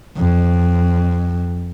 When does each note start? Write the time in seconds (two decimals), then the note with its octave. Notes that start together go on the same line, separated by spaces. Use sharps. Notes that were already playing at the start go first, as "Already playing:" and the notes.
0.17 F2